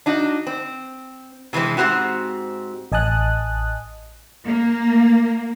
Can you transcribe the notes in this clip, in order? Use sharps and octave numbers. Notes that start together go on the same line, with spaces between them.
D4 D#4 F#4
C4
C3 E3 F#3 G#3 C4
G#2 C3 C4 F#4 G4
A1 D#5 G#5 A5 D#6 F#6
A#3